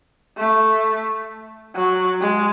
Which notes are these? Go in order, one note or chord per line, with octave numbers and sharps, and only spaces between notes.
A3
F#3
G#3